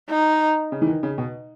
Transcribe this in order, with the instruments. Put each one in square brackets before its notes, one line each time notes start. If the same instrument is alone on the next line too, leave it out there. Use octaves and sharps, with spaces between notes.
[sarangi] D#4
[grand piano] C#3
E3
D#3
C#3
B2